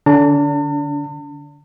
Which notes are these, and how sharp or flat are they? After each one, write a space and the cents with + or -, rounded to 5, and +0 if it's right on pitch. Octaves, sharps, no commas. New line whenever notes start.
D3 +0 D4 -35 A5 +45